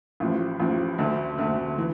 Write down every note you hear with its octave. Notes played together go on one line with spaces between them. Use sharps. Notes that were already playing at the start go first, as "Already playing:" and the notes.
A1 A2 F3
A1 A2 F3
D2 D3 A3
D2 D3 A3
E3